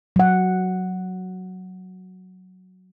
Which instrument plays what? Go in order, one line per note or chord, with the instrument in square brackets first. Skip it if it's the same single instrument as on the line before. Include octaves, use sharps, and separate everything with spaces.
[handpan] F#3 F#5